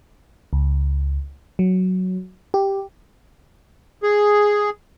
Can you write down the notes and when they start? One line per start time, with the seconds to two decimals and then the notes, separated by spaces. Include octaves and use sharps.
0.53 C#2
1.59 F#3
2.54 G4
4.03 G#4